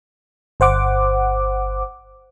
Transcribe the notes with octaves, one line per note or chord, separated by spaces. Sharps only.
G1 C5 F#5 D6